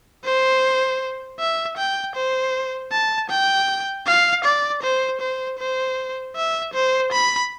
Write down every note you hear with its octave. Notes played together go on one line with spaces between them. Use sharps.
C5
E5
G5
C5
A5
G5
F5
D5
C5
C5
C5
E5
C5
B5